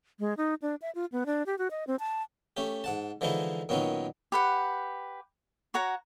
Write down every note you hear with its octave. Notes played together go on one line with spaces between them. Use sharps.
G#3
D#4
D4
E5
F4
B3
D4
G4
F#4
D#5
C4
A5
A3 C#4 G4
G#2 F#5 A5
D3 E3 F3 G#3 D#4 E4
F#2 A#2 D#3 B3 C#4 D#4
G4 B4 F#5
F#4 C#5 F#5 A#5